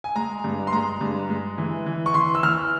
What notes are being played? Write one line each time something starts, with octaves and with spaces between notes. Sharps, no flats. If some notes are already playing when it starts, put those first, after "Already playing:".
G#5
G#3 A#5
G2
C6
G#3 A#5
G2
G#3
E3
E3
C#6
E3 C6
E6
E3 F6